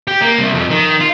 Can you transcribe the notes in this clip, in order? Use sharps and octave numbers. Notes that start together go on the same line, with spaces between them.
G4
A#3
C2
F2
D#3
F4